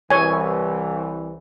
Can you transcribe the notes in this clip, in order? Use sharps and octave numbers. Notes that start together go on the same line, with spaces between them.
C2 E3 C#5 G#5